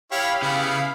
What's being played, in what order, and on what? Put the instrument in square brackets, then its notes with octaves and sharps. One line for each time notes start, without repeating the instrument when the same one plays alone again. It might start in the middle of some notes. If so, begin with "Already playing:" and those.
[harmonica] E4 C#5 [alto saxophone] G4 [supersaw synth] F5 B5
[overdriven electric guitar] C#3 [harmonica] B3 E4